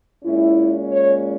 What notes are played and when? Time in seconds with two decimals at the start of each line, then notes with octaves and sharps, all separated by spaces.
0.23 A#2 G#3 C#4 E4
0.92 C#5